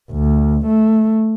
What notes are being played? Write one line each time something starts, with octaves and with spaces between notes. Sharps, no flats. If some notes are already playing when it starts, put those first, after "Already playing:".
D2
A3